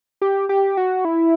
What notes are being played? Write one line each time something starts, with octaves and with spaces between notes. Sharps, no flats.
G4
G4
F#4
E4